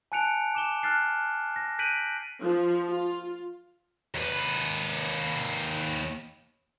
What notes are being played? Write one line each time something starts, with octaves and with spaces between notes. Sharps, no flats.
G#5 A5 F#6 C#7 D7 F7
D6 E7 G7
A5 F6 F#6 A6 C7
A#6
F#6 G6 B6 D7 D#7 F#7
F3
F4
D#2 B4